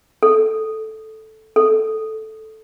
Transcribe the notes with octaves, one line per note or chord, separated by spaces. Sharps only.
A4
A4